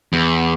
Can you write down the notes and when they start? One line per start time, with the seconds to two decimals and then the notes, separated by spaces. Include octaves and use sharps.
0.13 E2